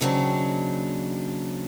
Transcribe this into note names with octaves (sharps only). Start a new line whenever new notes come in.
D#2 C#3 F#3 C4 D4